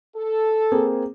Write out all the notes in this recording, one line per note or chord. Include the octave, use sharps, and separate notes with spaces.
A4
A#3 C4 G#4